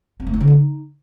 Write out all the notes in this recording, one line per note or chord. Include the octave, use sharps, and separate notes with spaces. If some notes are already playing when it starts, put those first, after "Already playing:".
C4
A3
E4
D3
D#4